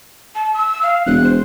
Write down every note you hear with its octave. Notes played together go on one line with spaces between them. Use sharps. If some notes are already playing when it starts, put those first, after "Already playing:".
A5
E6
F5
E1 F#6
C5